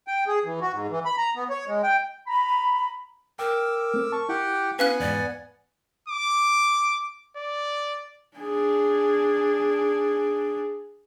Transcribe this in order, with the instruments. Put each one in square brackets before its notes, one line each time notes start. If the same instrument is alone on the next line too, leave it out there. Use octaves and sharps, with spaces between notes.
[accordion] G5
G#4
E3
F#4
G#2
E3
B5
A#5
B3
C#5
G#3
G5
[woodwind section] A#5 B5
[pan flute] A#4 [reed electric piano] G5 [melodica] D6 E6
[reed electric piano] A3 C4
[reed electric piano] A5 [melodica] C#6
[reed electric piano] E4 [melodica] G4 F#5 G5
[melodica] B3 F#5 G#5 [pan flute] C#4 [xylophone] B4 F5 F#6
[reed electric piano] E2 G#2 [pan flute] D5
[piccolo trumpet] D6
D5
[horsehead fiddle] D4 G#4